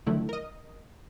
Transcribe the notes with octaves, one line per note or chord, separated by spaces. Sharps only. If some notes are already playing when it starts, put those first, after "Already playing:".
D3 D#3 F3 F#3 A3 E4
A#4 D#5